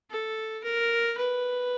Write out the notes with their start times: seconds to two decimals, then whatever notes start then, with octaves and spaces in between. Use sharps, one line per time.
0.10 A4
0.63 A#4
1.17 B4